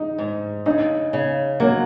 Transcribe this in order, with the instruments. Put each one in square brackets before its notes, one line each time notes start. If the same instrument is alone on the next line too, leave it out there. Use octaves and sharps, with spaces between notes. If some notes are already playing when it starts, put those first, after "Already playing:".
Already playing: [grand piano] D#4
[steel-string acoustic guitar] G#2
[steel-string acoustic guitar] C#3 [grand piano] D#4
[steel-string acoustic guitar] C#3
[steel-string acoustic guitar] F#3 [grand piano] A#3